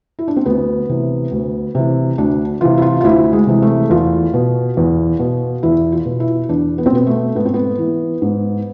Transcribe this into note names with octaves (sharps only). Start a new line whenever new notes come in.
E4
D4
C4
D2 B3
C3 E3
D2
C3 E3
D2 D4
C3 E3 F4
E4
F4
F4
D2 E4
G#3
C3 E3
A3
E2 F4
B2
E2
B2
E2 E4
F4
B2
E4
E2 D4
B3
C4
B2 B3
A3
G#2 B3
C4
B3
E3
G#2